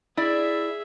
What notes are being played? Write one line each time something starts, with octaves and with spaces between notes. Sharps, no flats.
E4 G#4 D5 E5